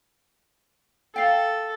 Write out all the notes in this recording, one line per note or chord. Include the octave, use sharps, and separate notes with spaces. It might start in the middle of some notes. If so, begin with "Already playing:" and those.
A4 F5 G5